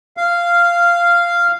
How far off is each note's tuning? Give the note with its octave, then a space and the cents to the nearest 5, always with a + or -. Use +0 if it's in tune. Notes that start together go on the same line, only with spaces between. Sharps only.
F5 -10